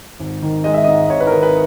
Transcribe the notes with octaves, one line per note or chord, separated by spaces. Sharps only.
G#1
D#3
G#3 D#5
E5
D#5
G#2
G#1 C#5
B4
A#4
D#3 B4
B4